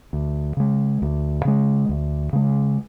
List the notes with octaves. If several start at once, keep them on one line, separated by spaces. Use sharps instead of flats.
D2
C#3 G#3
D2
C#3 G#3
D2
C#3 G#3